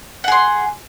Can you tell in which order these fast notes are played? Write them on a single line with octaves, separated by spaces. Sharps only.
F#5 G#4 C6